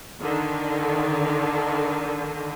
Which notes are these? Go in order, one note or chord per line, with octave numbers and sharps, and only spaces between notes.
D3 D#3